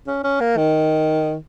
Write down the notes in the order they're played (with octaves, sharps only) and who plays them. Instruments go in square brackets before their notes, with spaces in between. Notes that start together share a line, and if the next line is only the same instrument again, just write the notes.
[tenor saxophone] C#4
C#4
A#3
D#3